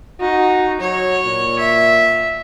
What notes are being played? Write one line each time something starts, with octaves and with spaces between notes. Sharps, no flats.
D#4 F#4
F#3 C#5
A#2
E5